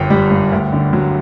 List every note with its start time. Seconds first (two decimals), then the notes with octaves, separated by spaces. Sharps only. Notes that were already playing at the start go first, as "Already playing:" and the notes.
Already playing: G1 F#2 G5
0.10 G3
0.31 G2
0.52 D2
0.73 D3
0.93 F#3